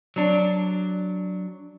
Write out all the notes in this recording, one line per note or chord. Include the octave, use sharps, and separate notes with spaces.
F#3 D4